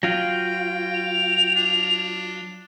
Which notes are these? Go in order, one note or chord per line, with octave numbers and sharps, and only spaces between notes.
F#3 F4 G5
F7
D4